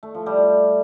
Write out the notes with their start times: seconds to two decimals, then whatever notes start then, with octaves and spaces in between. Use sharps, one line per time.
0.03 A3
0.14 F3
0.26 G3